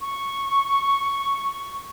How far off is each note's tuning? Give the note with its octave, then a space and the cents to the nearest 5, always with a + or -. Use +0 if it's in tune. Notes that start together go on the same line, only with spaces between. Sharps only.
C#6 -5